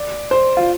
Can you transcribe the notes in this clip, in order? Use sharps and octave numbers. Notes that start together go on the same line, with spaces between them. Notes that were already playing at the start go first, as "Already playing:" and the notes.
Already playing: D5
C5
F4